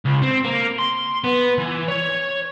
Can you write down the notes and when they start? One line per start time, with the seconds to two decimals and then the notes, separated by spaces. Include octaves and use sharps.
0.06 C#2
0.23 C4
0.45 A#3
0.79 C6
1.24 B3
1.58 E3
1.88 C#5